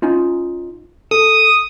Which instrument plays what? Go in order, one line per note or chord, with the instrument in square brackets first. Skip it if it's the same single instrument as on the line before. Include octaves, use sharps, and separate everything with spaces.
[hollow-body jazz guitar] C#4 D#4 F4
[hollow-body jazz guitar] A4 [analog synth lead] D#6